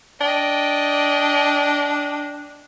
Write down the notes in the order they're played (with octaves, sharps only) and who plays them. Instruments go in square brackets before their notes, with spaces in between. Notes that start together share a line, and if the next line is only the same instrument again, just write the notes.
[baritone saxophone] D4 [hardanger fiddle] D#5 G5